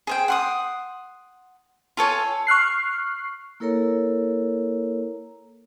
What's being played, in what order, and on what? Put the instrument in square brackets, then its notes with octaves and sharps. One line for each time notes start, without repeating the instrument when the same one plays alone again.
[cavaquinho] G#4 C5 G5
F#5 C6 D#6
F4 A4 C#5 G#5
[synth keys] C#6 F6 F#6 C7
[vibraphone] A#3 E4 A4 A#4 C#5 A#5